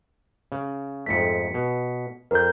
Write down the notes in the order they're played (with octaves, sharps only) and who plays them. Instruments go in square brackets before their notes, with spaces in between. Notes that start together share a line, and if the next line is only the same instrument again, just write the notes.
[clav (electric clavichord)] C#3
[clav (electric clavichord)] F2 G#2 A3 [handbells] B6 C#7
[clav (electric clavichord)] B2
[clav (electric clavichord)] F2 [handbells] A#4 G6